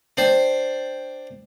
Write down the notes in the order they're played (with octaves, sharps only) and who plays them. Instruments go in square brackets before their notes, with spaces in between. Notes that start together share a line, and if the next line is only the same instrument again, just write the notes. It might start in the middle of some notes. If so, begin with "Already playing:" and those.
[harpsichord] D4 C5 D5 G5